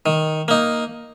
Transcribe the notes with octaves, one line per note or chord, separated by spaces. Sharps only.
D#3
A#3 D#4